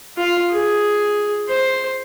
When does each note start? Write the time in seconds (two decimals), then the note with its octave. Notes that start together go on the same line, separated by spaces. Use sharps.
0.17 F4
0.52 G#4
1.49 C5